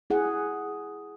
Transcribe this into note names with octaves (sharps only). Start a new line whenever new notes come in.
E4 G#4 F#5